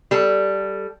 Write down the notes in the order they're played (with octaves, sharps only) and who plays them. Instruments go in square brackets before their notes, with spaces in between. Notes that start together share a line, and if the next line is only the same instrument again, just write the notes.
[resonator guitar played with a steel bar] G3 A4